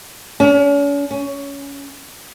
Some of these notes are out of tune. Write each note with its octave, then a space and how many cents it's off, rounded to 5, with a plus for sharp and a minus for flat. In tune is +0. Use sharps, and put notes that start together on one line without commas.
C#4 +40
C#4 +15